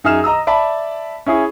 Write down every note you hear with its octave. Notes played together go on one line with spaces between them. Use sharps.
F#2 D#4 G#4 E5 F6 E7
D#5 A#5 D#6 E6
D5 E5 A5 B5
C#4 E4 G#4